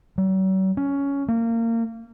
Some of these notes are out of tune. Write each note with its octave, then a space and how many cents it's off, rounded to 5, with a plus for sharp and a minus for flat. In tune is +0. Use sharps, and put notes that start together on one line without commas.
F#3 +45
C#4 +10
A#3 -25